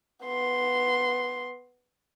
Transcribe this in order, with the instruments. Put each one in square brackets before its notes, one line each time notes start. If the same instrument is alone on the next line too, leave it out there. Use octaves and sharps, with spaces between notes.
[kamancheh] B3 C6